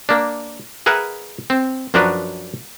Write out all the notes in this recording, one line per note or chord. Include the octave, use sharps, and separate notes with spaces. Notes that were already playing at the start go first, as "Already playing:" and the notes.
A#3 D4
G#4 A#4 B4 E5 F#5
C4
F#2 F3 D4 F#4 A#4 B4